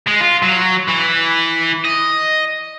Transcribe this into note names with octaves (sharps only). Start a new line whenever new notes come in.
G#3
F4
F#3
E3
D#5